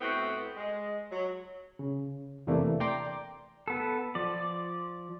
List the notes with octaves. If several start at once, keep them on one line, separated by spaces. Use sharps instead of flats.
A2 B3 C4 F#4
G#3
F#3
C#3
E2 C3 E3 A3 A#3 D4
D5 G5 A#5 C6 D6
B3 A4
F3 D5